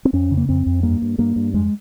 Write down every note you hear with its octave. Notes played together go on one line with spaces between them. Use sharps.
C4
F2 C#4
C#3
A#3
F2 C4
F2
G2 A#3
G2
G2 A#3
G2
F2 G#3